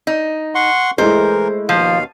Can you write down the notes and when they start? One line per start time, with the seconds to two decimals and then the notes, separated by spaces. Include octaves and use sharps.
0.07 D#4
0.55 F#5 C6 C#6
0.98 E3 G#3 A3 E4 A#4 C5
1.69 D#2 B2 F3 F5